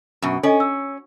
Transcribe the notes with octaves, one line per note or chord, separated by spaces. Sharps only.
F#2 B2
C#4 A4 D#5 G#5
E6